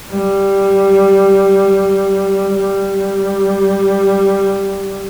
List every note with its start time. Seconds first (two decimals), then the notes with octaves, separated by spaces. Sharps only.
0.10 G3
2.55 G3